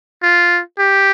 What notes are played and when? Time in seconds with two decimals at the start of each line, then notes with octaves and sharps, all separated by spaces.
0.23 F4
0.79 G4